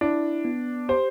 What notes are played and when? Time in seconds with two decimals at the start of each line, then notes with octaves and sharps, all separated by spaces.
0.01 D4 E4
0.45 B3
0.89 G4 C5